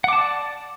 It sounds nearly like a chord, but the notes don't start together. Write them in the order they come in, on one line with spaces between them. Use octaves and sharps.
F#5 D6 A5 D5